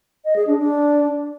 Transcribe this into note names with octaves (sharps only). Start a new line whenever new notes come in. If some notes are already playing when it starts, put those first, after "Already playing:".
D#5
G#4
D4
D4